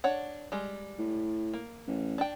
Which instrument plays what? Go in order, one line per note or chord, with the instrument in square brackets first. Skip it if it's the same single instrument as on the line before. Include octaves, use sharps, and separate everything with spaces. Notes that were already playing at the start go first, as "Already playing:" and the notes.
[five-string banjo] D4 C#5 F#5
G3 G#3
[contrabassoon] A2
[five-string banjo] A#3
[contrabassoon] A1
[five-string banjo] D4 G5